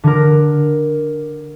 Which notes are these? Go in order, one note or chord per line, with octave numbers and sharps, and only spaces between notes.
D3 A#4